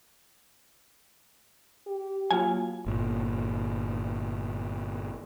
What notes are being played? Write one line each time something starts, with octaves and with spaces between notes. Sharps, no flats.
G4
F#3 A#3 F4 F#5 G#5
G1 A#2